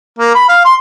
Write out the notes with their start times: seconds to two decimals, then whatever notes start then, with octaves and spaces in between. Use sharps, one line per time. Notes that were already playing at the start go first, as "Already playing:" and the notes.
0.19 A#3
0.35 B5
0.49 F5
0.65 C6